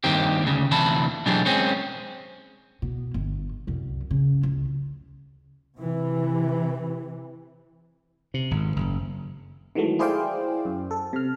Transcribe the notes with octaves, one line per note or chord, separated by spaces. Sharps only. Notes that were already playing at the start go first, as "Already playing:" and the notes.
G2 D#3 A#3 C4 G4
D2 C#3
D2 C3 E3 A5 B5
B2 E3 F#3 D4 G4 G#4
G#3 C4 C#4
B2
G1
C2 F#2
C#3
C#2
C3 E3
C3
G#1
F#1
D#3 E3 F#3 G#3 A3
E4 G#4 C5 D5 F5 G5
F#2
A4
C3 F6